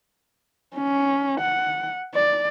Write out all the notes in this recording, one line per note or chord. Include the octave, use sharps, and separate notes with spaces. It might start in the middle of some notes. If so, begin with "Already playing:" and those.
C#4
F#5
D5